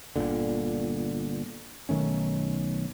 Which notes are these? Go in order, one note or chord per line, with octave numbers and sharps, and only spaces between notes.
G1 C2 A#2 D3
B1 D#3 A3 C#4